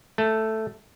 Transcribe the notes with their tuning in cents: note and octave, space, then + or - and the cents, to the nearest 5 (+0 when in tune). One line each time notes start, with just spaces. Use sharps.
A3 +0 A4 +0